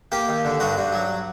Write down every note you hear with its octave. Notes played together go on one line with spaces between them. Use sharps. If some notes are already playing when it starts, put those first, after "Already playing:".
A#3 G4
D#2
D3
G2 F#4
G2
F#3